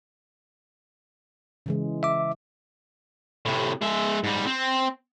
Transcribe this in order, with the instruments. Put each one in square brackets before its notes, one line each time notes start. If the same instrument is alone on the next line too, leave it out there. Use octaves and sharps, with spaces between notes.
[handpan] C#3 E3 G#3
[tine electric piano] E5 D6
[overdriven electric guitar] A2 C3
G#3 E5
G#2 G3
C4